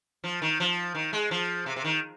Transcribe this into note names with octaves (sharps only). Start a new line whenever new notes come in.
F3
D#3
F3
D#3
G#3
F3
C3
C3
D#3